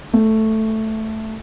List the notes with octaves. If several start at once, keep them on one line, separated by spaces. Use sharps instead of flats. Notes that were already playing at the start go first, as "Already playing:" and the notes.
A3